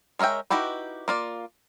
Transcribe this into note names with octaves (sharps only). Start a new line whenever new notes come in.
G#3 A#4 C#5 E5 G5
D#4 E4 F#4 G4 B4
A#3 F4 D5